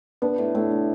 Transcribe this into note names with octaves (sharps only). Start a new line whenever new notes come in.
B3 D4
A2
A2 A3
D4